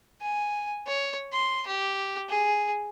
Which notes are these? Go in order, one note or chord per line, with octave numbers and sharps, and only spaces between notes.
G#5
C#5
C6
G4
G#4